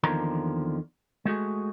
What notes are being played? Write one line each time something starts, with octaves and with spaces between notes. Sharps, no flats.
E2 D3 D#3 F3 A#3 A#5
G#3 A3 F#4 G#4